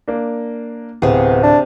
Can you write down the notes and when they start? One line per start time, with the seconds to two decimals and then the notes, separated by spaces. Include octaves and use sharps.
0.08 A#3 D4
1.02 D1 C3 B3 G#4
1.43 D4